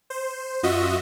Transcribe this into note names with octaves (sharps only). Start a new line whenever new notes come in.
C5
F#2 F4 F#4 D#5 E5